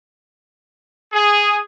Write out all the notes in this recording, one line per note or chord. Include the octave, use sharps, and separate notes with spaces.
G#4